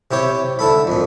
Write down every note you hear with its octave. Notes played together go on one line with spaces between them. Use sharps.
C3 E4 G4 C#5
D3 E4 A4 B5
F2 A#2